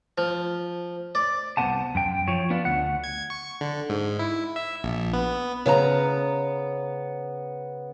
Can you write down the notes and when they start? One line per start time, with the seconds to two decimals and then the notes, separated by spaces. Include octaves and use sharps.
0.18 F3
1.15 D5
1.57 C2 F3 B3 C5 F#5 A5
1.95 F#2 G5
2.28 F3 C#5
2.50 B3 D4 F4
2.65 D2 F#5
3.04 G#6
3.30 C#6
3.61 D3
3.90 G#2
4.19 E4
4.56 E5
4.84 A#1
5.13 B3
5.66 C#3 B3 G#5 A#5